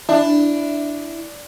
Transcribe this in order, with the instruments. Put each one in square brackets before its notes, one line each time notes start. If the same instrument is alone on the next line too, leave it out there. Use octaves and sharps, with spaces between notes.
[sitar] D4 [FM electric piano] E4